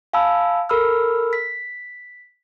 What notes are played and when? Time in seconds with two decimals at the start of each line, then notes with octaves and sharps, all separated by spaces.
0.13 F5 G#5 A5 B5 E6
0.69 A4 A#4 B5 E6 F6
1.33 B6